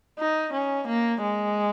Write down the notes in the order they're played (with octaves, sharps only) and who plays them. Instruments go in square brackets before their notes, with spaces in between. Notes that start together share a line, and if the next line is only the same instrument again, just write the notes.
[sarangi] D#4
C#4
A#3
G#3